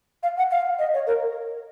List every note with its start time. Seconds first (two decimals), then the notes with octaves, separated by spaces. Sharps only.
0.23 F5
0.37 F#5
0.51 F5
0.79 D#5
0.94 C#5
1.07 A#4